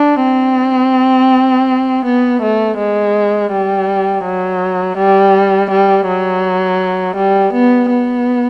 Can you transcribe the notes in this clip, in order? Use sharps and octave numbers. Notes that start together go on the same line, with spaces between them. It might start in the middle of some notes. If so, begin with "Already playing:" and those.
Already playing: D4
C4
B3
A3
G#3
G3
F#3
G3
G3
F#3
G3
B3
B3